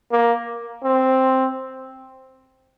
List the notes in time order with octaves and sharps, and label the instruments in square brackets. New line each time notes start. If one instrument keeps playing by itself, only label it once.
[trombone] A#3
C4